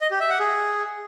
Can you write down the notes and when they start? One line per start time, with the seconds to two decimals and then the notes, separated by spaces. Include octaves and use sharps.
0.01 D#5
0.11 G4
0.20 E5
0.30 F#5
0.39 G#4